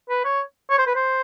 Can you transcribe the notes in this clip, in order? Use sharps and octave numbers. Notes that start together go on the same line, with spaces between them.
B4
C#5
C#5
C5
B4
C5